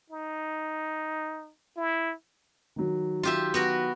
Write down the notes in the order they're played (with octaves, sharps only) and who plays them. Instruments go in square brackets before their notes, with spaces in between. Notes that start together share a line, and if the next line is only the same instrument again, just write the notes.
[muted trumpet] D#4
E4
[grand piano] D#3 F#3
[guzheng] F4 G4 E5
B3 F#4 A#4